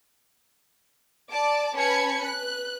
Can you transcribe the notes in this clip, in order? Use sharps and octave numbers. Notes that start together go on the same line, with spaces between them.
D5 A5 D6
C#4 B4 A5 B5 G#6 C#7
B4 F#6